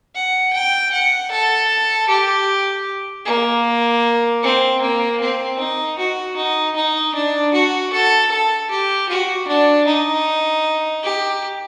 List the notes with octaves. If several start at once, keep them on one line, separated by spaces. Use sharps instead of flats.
F#5
G5
F#5
A4
G4
A#3
C4
A#3
C4
D#4
F#4
D#4
D#4
D4
F#4
A4
A4
G4
F#4
D4
D#4
G4